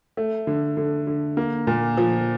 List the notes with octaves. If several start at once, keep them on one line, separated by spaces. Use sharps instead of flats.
A3
D3
D3
D3
A#3
A#2
F3